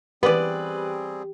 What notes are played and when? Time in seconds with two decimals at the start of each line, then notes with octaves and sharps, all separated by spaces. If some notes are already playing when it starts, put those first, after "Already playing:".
0.23 E3 G3 B3 C4 G4 G#4 B4 D5